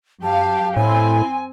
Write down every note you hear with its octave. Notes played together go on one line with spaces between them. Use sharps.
F#2 G4 F5 A5
A2 C4 E4 G#5